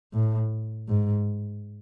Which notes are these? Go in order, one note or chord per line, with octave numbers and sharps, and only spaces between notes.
A2
G#2